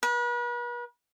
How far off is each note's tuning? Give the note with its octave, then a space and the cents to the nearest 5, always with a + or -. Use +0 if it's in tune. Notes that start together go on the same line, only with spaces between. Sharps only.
B4 -40